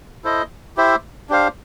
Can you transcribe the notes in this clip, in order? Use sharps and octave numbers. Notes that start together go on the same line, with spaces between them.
E4 A4 C5 D#5
E4 G4 C5 E5
D4 G4 C5 F5